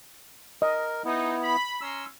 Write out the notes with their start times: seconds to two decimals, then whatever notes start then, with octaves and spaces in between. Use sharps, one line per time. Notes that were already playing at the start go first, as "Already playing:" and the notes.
0.62 A#4 D#5
1.05 B3 D#4 E4
1.42 B5
1.81 C#4 A#5 C6 E6